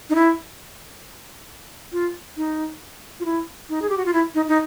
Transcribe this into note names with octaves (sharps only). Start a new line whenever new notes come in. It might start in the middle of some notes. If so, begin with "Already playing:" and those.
D#4
E4
F4
D#4
F4
E4
D#4
G#4
G4
F#4
F4
E4
D#4
D#4